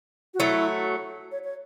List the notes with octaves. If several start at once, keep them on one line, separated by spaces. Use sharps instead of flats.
F#4
F#3 A3 E4
C#5
C#5